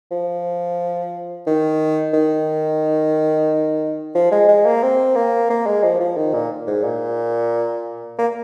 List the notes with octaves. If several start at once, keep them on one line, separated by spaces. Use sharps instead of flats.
F3
D#3
D#3
F3
G#3
G#3
A#3
C4
A#3
A#3
G#3
F3
F3
D#3
A#2
G#2
A#2
A#3